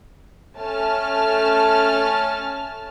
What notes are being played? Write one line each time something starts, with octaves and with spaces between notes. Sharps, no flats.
A3 C#4 A5 F6